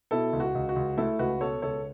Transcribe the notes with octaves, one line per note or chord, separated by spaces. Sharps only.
B2 E4 A4
C#2
F#4
C#2
F#4
C#2
A3 E4 A4
C#2 F#4 B4
B2 A4 C#5
C#2 A4 C#5